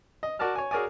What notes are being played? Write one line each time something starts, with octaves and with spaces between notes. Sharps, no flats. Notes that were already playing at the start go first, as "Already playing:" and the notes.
D#5
F#4 A#4 D5 A5 F6
C#5 G#5
F#4 G#4 A#4 C#5 D5 G#5